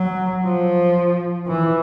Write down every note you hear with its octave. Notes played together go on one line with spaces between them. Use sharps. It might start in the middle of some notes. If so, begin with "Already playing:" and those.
Already playing: F#3
F3
E3